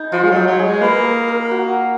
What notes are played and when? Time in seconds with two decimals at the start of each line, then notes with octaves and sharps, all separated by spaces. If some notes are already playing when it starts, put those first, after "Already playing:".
Already playing: D#4 G#4
0.12 F3 F4
0.23 G#3
0.30 F#3
0.36 D#4
0.47 F#3
0.59 G#4
0.64 G#3
0.81 A#3 B4
1.04 A#4
1.28 A#4
1.51 F#4